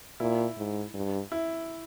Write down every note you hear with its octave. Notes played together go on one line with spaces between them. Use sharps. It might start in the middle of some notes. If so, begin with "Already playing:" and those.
A#2 E4
G#2
G2
E4